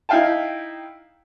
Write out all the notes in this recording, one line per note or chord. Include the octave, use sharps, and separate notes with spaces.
D#4 E4 E5 F5 G5 A5